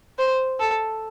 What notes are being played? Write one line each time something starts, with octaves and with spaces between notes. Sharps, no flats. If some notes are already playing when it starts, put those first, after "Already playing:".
C5
A4